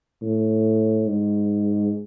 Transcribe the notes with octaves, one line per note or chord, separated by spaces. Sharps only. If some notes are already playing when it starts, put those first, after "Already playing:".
A2
G#2